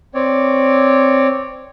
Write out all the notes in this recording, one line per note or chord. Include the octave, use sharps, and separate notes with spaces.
C4 C#5 D5